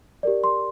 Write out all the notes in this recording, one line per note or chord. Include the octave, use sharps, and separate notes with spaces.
G4 A#4 D5
C6